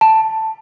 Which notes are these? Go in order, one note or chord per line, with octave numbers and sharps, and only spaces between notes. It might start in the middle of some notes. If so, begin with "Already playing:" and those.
A5